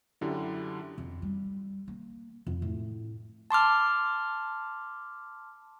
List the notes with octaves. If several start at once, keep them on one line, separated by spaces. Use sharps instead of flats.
F#2 D3 E4 G4
F2
G3
A#3
F2
A2
A5 C6 D6 F6